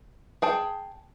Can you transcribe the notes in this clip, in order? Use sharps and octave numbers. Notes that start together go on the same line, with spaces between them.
G#4 G5 A5